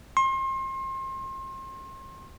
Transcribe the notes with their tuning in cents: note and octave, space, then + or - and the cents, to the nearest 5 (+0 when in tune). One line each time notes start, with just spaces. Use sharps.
C6 +35